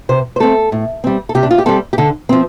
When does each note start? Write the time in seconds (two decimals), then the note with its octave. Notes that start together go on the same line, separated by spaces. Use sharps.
0.09 C3 C5
0.36 C5
0.40 A3 C4 A4
0.72 A2
1.04 G3 C4
1.29 A4
1.35 C3 G4
1.43 D4
1.51 F4
1.58 G4
1.66 G3 C4 A4
1.93 G4
1.98 D3 A4
2.29 F3 C4